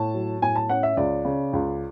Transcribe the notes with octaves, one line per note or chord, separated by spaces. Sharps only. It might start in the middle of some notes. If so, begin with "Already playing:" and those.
Already playing: A2 A5
F#3
A2 G#5
A5
C#4 F#5
E5
C#2 D5
C#3
C#2